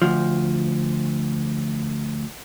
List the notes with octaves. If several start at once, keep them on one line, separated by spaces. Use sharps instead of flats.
D2 F3